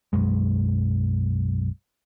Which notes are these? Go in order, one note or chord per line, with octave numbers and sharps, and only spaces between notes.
B1 F#2 G#3